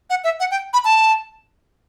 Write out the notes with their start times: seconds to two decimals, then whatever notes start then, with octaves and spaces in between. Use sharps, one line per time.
0.10 F#5
0.24 E5
0.40 F#5
0.51 G5
0.73 B5
0.85 A5